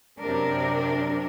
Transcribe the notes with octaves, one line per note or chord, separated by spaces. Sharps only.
F#2 C3 F#3 D4 A#4